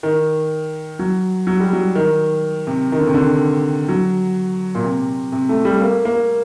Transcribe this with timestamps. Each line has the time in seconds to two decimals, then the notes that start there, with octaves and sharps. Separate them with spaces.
0.03 D#3
0.99 F#3
1.47 F#3
1.60 G3
1.73 F#3
1.95 D#3
2.67 C3
2.92 D#3
2.99 D3
3.07 C3
3.14 D3
3.89 F#3
4.75 A#2
4.84 C3
5.32 C3
5.49 A3
5.65 G3
5.81 A#3
6.05 A#3